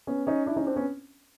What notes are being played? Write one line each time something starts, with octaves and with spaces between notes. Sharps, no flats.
B3 C#4
C#4 D#4
D4 E4
C#4 D#4
C4 D4
B3 C#4